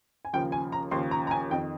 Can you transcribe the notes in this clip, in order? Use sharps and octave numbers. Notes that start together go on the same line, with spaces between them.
G#5
D#2 C#3 F3 G5
G#5
A#5
D#2 C#3 F3 C6
A#5
A#5
G#5
F2 D#3 G5